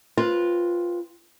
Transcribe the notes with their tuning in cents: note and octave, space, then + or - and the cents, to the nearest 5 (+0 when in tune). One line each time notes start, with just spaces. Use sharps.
C4 +0 F4 +0 B4 -20